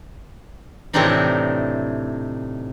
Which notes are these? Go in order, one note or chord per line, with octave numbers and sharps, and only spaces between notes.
A2 C3 E3 C4 D4 D#4